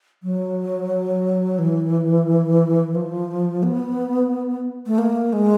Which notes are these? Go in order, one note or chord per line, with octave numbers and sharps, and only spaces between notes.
F#3
E3
F3
B3
A3
A#3
G#3